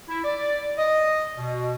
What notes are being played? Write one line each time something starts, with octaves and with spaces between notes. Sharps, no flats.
E4
D5
D#5
B2